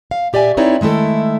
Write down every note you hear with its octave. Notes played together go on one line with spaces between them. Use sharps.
F5
A#2 G4 D5 E5 G#5
C4 D#4 E4 B4 C#5 D5
D#3 G#3 A3 E4 A4